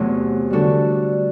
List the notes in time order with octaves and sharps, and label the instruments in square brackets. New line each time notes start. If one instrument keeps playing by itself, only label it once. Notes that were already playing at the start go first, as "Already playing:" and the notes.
Already playing: [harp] E2 C3 F#3 A3
D3 G3 D4 F#4 A4